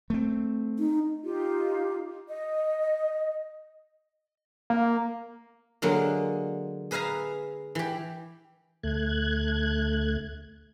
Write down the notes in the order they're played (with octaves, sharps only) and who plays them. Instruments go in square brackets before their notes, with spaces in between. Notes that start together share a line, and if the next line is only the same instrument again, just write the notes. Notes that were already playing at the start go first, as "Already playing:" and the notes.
[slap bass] A3 C4
[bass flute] D#4
[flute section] D#4 F4 G4
D#5
[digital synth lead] A#3
[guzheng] D3 F#3 G#3 A#3
G#4 B4 E5 F5 G#5 A#5
E3 G4
[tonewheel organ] D2 A3 F#6 G#6